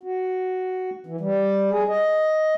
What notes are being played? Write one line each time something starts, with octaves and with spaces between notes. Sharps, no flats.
F#4
E3
G3
G#4
D#5